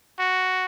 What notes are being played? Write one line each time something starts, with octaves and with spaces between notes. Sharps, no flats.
F#4